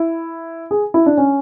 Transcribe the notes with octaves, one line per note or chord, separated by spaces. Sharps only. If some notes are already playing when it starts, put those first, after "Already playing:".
Already playing: E4
G#4
E4
D4
C#4